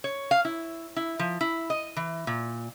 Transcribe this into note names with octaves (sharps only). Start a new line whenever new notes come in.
C#5
F5
E4
E4
F3
E4
D#5
E3
A#2